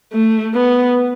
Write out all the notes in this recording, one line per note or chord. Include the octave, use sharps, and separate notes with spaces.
A3
B3